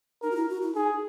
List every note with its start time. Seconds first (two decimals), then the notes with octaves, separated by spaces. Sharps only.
0.22 D#4 A#4
0.31 F#4
0.36 E4
0.49 F#4
0.62 E4
0.75 D#4 G#4